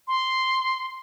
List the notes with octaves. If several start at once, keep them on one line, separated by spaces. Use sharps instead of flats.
C6